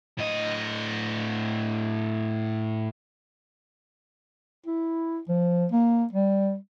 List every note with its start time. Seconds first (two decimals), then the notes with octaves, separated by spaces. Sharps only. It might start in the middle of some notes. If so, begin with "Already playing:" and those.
0.18 A2 D#5
4.66 E4
5.28 F3
5.72 A#3
6.13 G3